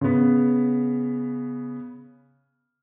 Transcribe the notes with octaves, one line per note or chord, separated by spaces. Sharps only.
C#3 B3